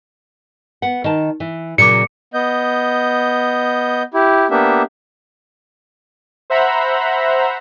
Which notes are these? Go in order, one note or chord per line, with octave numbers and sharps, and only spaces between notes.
B3 F#5
D#3 A5
E3
A#2 C#3 F#3 D6 C#7
B3 D#5 G6
E4 G4
A#3 B3 D4 G4 E5
C5 E5 F#5 A#5 B5